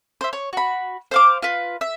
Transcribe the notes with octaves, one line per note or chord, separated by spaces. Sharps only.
C5 E5
C#5
F#4 B5
C5 F5 D6
F4 B4
E5